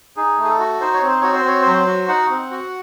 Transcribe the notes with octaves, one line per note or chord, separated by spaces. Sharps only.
D#4 G#4
A3 G#4
A4
F#4
D#4 C5
C#5
C4
C5
F#4 C#5
C5
C4 C#5
C5
F#3
F#4
D#4 F#5
C4
F#4